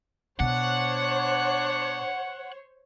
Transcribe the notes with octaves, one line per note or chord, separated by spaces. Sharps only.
B2 D4 C5 C#5 F#5